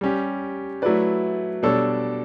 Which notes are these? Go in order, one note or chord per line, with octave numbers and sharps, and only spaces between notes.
G3 C#4 G4
F#3 A3 E4 B4 D5
B2 G3 D4 A4 C#5